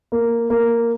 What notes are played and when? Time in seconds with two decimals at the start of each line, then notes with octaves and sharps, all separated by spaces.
0.12 A#3
0.50 A#3